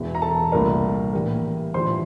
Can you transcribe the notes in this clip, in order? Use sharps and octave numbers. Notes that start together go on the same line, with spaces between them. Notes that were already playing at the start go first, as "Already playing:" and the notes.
Already playing: E1 E2 E3
A#5
A4 A5
C2 A#2 A3 D4 A#4 A#5
A2 E3 G3 A#3
A2 E3 G3 D4 F4 C5 C6